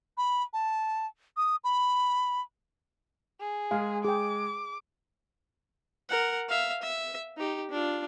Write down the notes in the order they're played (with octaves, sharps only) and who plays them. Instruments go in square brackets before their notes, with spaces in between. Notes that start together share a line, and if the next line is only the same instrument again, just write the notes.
[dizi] B5
A5
D#6
B5
[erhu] G#4
[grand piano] G#3 [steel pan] F5
[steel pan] G#4 G5 [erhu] D6
[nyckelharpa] A#4 F#5
E5 F5
E5
D#4 G4
D4 F4